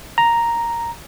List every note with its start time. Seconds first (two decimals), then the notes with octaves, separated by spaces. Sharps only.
0.18 A#5